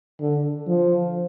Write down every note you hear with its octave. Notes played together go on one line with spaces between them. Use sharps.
D3
F3